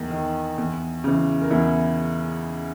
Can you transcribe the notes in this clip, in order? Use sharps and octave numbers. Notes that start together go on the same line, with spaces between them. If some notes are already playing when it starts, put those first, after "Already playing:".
Already playing: E2 D#3 D#4
D#3
E2
C#3 E3
A#4
E2 E4 G#4